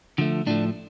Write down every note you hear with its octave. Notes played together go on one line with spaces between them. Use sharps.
D3 F3 A3
A2 F3 A3 D4